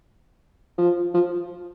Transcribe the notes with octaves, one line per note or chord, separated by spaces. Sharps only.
F3
F3